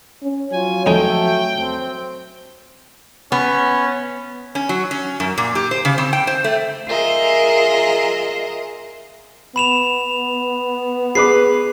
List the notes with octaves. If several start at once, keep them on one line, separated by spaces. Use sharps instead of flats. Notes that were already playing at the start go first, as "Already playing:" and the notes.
C#4
F3 F#3 F4 C#5 G#5
F2 A3 D#4 G5 G#5
C4
B3 C#4
C#4
F#3
C#4
F#2
A#2
G4
C5
C#3
C4
G5
C5
A3
F4 G#4 A#4 D#5 E5
B3 B5 E7 F7
G#4 B4 D6 C7